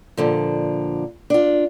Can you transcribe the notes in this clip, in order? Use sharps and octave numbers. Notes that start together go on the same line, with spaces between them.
A#2 D3 F3
D4 F4